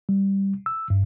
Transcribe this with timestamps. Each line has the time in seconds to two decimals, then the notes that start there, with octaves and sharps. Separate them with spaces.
0.09 G3
0.66 E6
0.90 G2